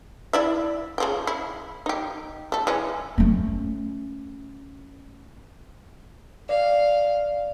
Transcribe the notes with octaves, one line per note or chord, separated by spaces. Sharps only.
E4 D5 E5
C#3 F3 G5
E4
D#4 G4
A3 A4
E3 G#3 C#4
A3 C#4
D5 F5